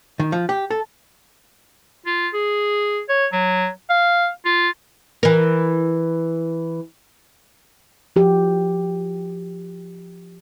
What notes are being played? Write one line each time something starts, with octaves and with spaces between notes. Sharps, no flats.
D#3
F3
G4
A4
F4
G#4
C#5
F#3
F5
F4
E3 A#4
F3 F#4 G4